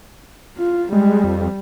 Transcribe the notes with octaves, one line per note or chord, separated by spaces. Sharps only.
F4
G3 G#3
F2